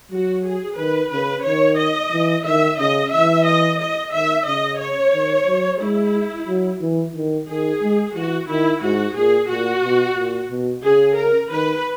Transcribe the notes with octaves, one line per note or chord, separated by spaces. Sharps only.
F#3 F#4
G#4
D#3 B4
C#3 B4
D#3 C#5
D#5
E3
D#3 E5
C#3 D#5
E3 E5
D#5
D#5
D#3 E5
C#3 D#5
C#5
D#3
F#3
G#3 E4
F#3
E3
D#3
D#3 G#4
G#3
E3 F#4
D#3 E4
G#2 F#4
A#2 G#4
A#2 F#4
B2
A#2
B2
C#3 G#4
A#4
D#3 B4